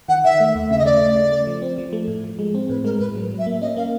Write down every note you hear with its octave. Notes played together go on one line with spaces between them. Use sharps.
D#3 F#5
D#3 E5
A3
D#2
C#3 E5
D#5
A3 D5
C#3
C#3
A3
F3
C4
F3
A3
A2
F3
G#3
C4
A2 B4
G#3 A#4
A2 B4
F#3
F#3
E5
A#3
C#4 D#5
A#3 F5